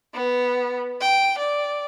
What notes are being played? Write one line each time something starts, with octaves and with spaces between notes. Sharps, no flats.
B3
G5
D5